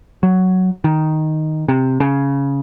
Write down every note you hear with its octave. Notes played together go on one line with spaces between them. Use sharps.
F#3
D#3
C3
C#3